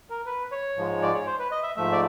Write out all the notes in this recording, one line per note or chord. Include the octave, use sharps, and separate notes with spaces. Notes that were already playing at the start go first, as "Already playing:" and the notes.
A#4
B4
C#5
G#2 F3 G#3
D5
C#5
C5
B4
D#5
E5
G#2 F3 A3 E5
D5